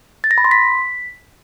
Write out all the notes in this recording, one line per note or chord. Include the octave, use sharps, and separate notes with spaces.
A6
A#6
B5
C6
B6